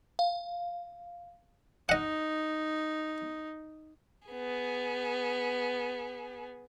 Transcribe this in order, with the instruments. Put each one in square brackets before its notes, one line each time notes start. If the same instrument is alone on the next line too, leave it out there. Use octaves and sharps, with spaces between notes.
[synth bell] F5
[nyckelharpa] D#4 [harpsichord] D#5 F#5
[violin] B3 G#4